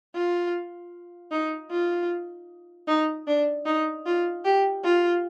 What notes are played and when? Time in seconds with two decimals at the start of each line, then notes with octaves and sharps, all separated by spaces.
0.15 F4
1.31 D#4
1.71 F4
2.88 D#4
3.27 D4
3.66 D#4
4.06 F4
4.45 G4
4.84 F4